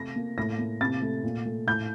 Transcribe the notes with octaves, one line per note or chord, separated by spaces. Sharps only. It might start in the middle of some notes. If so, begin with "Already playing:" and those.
Already playing: C3 A3 A#6
A#3
A2 A#6
A#3
C3 A6
A3
A#2
A3
A2 G6